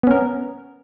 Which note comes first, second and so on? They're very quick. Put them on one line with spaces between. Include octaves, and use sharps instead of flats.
B3 C#4 A#4